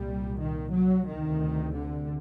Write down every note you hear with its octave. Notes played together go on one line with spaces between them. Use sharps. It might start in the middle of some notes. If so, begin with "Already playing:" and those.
Already playing: C2 A#2 G3
D#3
F#3
D2 C3 D#3
D3